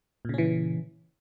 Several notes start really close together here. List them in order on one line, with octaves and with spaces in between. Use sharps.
A#2 C#3 C#4 E3